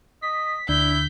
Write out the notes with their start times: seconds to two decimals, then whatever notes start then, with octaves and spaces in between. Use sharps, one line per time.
0.22 D#5 B6
0.69 D2 D4 E4 G6 B6